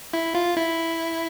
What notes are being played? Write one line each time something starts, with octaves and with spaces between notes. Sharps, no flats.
E4
F4
E4